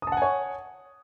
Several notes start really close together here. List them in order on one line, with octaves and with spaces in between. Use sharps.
D#6 A5 F#5 G#5 C#5